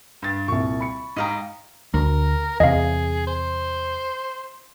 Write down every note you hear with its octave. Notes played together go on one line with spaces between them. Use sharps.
G2 A6
C2 A#2 C#6
B5 C#7
G#2 D#4 D#5 F5 G5 A#5
D2 A#4
E2 C3 G#4 D#5 F5
C5